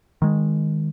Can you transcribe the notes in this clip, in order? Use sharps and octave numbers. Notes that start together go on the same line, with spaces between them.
D#3 G#3